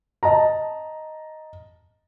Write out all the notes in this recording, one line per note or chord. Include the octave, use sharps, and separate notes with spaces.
D#5 A5 A#5